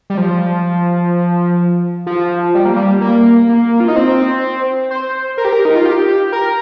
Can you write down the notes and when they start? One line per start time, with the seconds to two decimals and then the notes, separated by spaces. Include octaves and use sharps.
0.10 G3
0.17 F3
2.06 F3
2.55 G3
2.65 A#3
2.76 G3
3.01 A#3
3.49 A#3
3.80 F4
3.88 D#4
3.96 C4
4.91 C5
5.38 A#4
5.45 G4
5.53 A#4
5.65 D#4
5.76 F4
5.86 G4
6.32 A#4